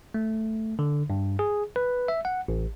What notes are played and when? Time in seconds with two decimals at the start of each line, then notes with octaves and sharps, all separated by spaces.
0.14 A3
0.79 D3
1.10 G2
1.39 G#4
1.76 B4
2.08 E5
2.25 F#5
2.48 A1